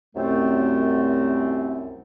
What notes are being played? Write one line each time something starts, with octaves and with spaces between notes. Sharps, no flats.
C2 F#2 A3 C4